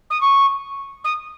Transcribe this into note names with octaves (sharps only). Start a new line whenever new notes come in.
D#6
C#6
D#6